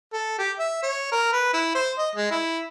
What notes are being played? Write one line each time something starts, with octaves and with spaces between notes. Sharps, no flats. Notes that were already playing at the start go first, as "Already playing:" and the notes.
A4
G4
E5
C#5
A#4
B4
E4
C5
D#5
G#3
E4